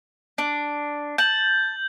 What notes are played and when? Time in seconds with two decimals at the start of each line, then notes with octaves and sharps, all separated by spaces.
0.38 D4
1.18 A5 G6 F#7